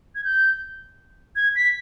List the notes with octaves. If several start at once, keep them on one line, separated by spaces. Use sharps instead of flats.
G#6
G6
G#6
B6